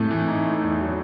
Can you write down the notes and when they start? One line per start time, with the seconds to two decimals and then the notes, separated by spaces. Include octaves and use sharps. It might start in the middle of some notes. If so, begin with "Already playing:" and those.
Already playing: A2 A3
0.11 E3
0.28 D#4
0.45 A3
0.62 E2
0.80 F#3